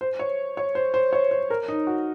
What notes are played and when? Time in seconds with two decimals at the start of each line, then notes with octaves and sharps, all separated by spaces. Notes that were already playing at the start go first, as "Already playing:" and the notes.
0.01 C5
0.19 C#5
0.57 C#5
0.75 C5
0.94 C5
1.13 C#5
1.31 C5
1.50 A#4
1.68 D#4
1.87 F#4